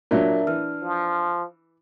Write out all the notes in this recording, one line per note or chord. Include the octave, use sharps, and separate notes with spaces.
A#2 F#3 D4 A#4 E5
E3 F6
F3